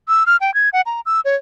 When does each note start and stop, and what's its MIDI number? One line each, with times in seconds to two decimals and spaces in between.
0.08 0.24 88
0.27 0.37 89
0.41 0.54 79
0.54 0.69 92
0.73 0.81 78
0.86 1.01 82
1.06 1.20 88
1.25 1.36 73